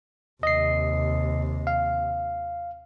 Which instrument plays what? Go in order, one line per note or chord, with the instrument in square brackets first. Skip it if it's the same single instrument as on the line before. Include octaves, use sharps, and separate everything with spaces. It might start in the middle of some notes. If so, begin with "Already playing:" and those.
[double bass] D#2 C3 [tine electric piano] D#5 C7
[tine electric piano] F5